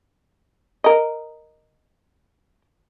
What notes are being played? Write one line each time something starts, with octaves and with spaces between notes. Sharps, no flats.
A#4 D#5